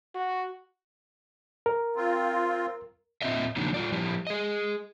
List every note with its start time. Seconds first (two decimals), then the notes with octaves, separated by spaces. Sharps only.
0.15 F#4
1.66 A#4
1.96 C4 F4
3.22 A#2 E3 C4 F4 D#5 E5
3.56 C#3 F3 F#3 A#3 D4 D#4
3.74 G3 F4 D5
3.92 F3 G3 E4 G4
4.27 G#4 D#5